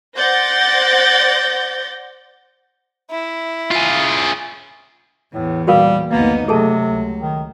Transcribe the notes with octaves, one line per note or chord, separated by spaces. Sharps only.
C5 D5 F#5 G6 A6 A#6
E4
F4 G#4
E2 A2
A#2 G3 F#4 A#4 F5
F#1 D2 A#3 B3 D#4
C3 F#3 A3 G#4 A4 A5
C#2
D#3